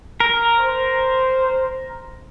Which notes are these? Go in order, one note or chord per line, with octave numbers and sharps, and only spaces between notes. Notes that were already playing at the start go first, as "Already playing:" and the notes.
A#4
C5